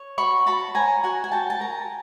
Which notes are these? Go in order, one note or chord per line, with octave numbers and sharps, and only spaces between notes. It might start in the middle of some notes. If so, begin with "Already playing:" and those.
Already playing: C#5
F#4 B5 C#6
F#4 A5 B5
C#5 G#5 A#5
F#4 F#5 G#5
G#5
F#4 G5 A5
A5
A#4 G#5 A#5